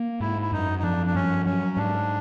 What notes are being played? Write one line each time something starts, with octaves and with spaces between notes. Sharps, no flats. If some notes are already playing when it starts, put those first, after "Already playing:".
Already playing: A#3
G#2 E4
E4
F#2 D#4
D#4
F3 D4
D4
G2 C#4
F#3 C#4
G#2 D4